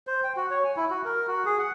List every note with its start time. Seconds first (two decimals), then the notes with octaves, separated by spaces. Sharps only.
0.07 C5
0.24 G5
0.36 F#4
0.50 C#5
0.65 G#5
0.77 E4
0.90 F#4
1.05 A#4
1.27 F#4
1.45 G#4
1.59 F#5